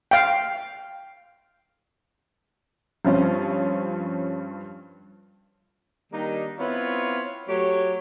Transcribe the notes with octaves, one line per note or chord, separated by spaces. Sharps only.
F5 G5
G2 F3 C4 C#4 F4
D#3 G3 A#3 D4 D#4
B3 C4 E4 F4 C#5
F#3 A3 G4 C#5